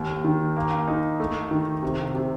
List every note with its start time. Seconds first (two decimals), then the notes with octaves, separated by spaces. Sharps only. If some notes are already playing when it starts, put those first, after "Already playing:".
Already playing: D#2
0.24 D#3
0.56 A#3
0.88 D#4
1.20 A3
1.51 D#3
1.83 C3
2.14 C3